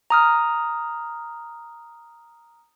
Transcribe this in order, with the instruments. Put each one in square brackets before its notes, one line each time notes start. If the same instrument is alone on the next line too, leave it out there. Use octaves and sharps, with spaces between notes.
[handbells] A#5 D#6 F6